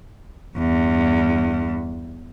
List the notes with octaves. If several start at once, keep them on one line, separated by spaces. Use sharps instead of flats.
E2 G2